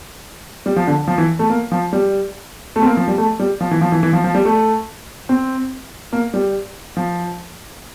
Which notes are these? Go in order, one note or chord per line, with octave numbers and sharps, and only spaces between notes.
G3
F3
D3
F3
E3
A3
A#3
F3
G3
A3
C4
A#3
F3
G3
A3
G3
F3
E3
F3
E3
E3
F3
F3
G3
A3
C4
A#3
G3
F3